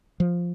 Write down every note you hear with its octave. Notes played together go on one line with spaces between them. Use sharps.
F3